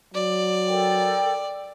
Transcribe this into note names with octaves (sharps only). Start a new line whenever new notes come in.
F#3 D5
A4 A#4 G5